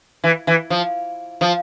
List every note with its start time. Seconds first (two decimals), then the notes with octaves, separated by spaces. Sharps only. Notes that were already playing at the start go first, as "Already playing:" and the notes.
0.24 E3
0.47 E3
0.70 F3
1.41 F3